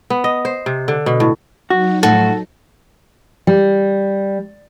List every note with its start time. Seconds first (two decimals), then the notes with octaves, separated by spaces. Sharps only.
0.10 B3
0.24 D#5
0.45 C5
0.66 C3
0.88 D3
1.06 B2
1.20 A2
1.70 F#3 D#4 F#4
2.03 A2 F3 A3 F#4 A4
3.47 G3